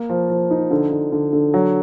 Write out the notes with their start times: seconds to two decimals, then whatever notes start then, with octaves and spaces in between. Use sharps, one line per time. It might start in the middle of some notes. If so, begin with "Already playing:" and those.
Already playing: A#3
0.09 F3
0.30 F3
0.51 D#4
0.71 D3
0.92 D3
1.12 D3
1.33 D3
1.54 F#3